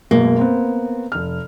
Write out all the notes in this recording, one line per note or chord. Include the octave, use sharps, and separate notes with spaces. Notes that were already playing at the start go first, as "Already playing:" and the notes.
F#2 B2 G#3 A#3
B3 C4
F1 F6